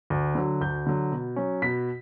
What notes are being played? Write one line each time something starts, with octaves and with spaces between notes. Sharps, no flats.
D2
D3 F#3
D2 G6
D3 F#3
B2
F#3 C#4
B2 B6